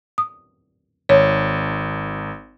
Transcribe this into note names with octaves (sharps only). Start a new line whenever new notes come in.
D#6
G#1 C#5